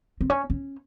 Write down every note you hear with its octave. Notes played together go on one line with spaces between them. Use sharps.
C4
C#4
C#4